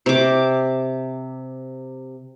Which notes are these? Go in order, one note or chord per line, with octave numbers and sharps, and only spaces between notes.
C3 D6